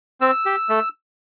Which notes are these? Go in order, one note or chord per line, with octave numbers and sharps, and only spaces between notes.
C4 E6
G4
A3